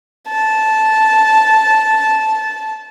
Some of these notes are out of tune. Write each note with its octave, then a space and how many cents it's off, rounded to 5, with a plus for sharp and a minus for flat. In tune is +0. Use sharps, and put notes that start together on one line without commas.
A5 -10